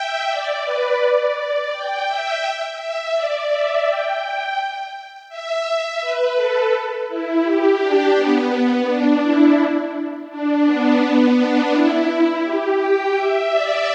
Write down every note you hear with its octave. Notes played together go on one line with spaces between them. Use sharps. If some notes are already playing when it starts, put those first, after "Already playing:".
Already playing: E5 G5
D5
B4
D5
D5
G5
E5
E5
D5
E5
G5
E5
B4
A4
E4
G4
D4
B3
B3
D4
E4
D4
B3
B3
D4
E4
G4
G5
E5
D5